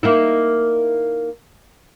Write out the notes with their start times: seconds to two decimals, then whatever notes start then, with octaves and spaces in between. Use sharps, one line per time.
0.03 A#3 D#4 E4